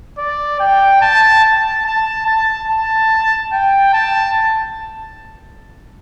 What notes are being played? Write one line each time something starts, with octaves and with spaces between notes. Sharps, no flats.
D5
G5
A5
A5
A5
A5
A5
G5
A5